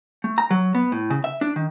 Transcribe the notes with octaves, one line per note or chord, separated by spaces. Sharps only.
A3
A#5
F#3
B3
A2
C#3
E5
D4
D#3